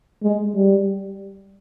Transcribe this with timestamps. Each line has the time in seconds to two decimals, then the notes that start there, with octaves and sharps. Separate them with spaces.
0.23 G#3
0.55 G3